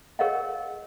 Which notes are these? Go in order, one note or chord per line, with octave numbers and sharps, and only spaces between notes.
G#4 A#4 C#5 D#5 F5 F#5